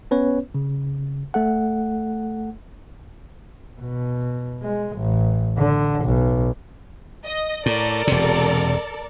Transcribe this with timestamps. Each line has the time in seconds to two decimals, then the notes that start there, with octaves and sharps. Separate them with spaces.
0.11 B3 C#4 B4 C#5
0.54 C#3
1.34 A3 A4 F#5
3.80 B2
4.63 G#3
4.97 A1
5.58 D3
6.05 B1
7.25 D#5
7.66 A2 A4 A#4 D5
8.07 E1 C3